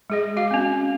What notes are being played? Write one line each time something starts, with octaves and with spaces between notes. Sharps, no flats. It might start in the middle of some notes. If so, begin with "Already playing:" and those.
G#3 G#4 D#5
F#4 F5
C4 C#4